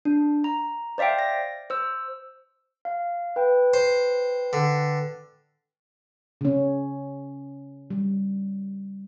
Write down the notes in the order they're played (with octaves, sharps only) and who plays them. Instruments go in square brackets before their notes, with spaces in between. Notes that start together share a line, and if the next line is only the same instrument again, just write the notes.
[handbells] D4
A#5
C5 D5 E5 F5 G5
A#6
C5 E6
F5
B4 G5
[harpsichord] C5
D3
[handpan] C#3 C#4
G3